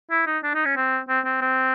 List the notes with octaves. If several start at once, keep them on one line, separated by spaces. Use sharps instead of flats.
E4
D#4
D4
D#4
C#4
C4
C4
C4
C4